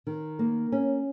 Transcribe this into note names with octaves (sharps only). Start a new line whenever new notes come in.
D#3
A#3
C#4